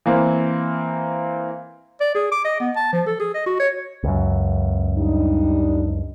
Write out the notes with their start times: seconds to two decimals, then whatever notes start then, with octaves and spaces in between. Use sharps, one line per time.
0.06 E3 A#3 C4
2.01 D5
2.15 G#4
2.32 D6
2.45 D#5
2.60 B3
2.76 A5
2.93 F3
3.07 A4
3.20 G#4
3.34 D#5
3.46 F#4
3.60 C#5
4.03 C#2 F#2
4.97 G3 D4 D#4